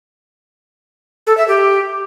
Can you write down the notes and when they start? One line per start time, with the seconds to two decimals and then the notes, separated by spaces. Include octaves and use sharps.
1.27 A4
1.37 E5
1.48 G4